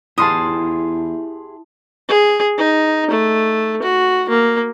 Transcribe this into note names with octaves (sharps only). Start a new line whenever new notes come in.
E2 E4 G4 G#4 A5 C6 D#6
G#4
D#4
A3
F#4
A#3